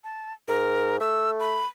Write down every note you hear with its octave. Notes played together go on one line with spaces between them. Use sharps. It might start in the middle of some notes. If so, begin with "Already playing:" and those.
A5
G#2 A#4
A3 E6
B5